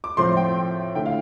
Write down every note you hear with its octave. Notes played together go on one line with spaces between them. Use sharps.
D6
A2 F3 C4 C6
G5
D3 A3 E4 G5
F5